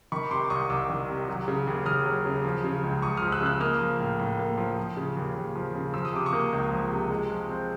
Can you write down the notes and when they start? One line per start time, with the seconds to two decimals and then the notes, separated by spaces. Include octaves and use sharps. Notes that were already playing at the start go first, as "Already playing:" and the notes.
0.12 D#3 B5 C#6
0.31 C3 C6 D6
0.50 C2 C#6 D#6
0.69 C2 D6 E6
0.90 D#3
1.08 C3
1.28 F#3
1.48 C#3
1.67 D#2
1.86 D#2 D#6 F6
2.06 F#3
2.26 C#3
2.45 F3
2.64 C#3
2.84 C#2
3.02 C#2 C#6 D#6
3.17 F3 D#6 F6
3.32 E6 F#6
3.41 C#3
3.46 E6 F#6
3.60 A#3 D#6 F6
3.81 F3
3.99 A2
4.19 A2
4.39 A#3
4.58 F3
4.77 F3
4.97 C#3
5.17 D#2
5.36 D#2
5.55 F3
5.75 C#3
5.93 F3 E6
6.05 D#6
6.13 C3 D6
6.26 C#6 D#6
6.33 A#3
6.52 C#2
6.71 F3
6.91 C3
7.11 G#3
7.29 F3
7.50 C4